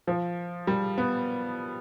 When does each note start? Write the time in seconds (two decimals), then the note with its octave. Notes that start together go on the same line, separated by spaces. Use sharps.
0.07 F3
0.67 G3
0.98 B3